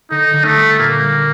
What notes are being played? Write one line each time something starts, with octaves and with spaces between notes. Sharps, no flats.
D3 D#4
D3
A3
G3
A#2 A#3
G3